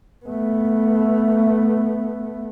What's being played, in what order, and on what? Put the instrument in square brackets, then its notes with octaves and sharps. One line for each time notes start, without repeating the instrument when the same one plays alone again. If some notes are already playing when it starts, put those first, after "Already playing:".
[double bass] A3 B3